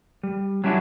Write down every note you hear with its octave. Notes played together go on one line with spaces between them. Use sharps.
G3
F#3 G3 C#4 D4 E4